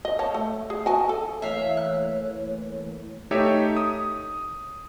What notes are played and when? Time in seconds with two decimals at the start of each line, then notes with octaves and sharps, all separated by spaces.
0.05 D#5
0.19 C#5 A5
0.34 A3
0.70 G#4
0.86 F#4 G#5 A5
1.09 A4
1.42 E3 A3 A#3 C#5 E5 F5
1.77 F#6
3.31 A3 D#4 G4 C#5 E5
3.77 D#6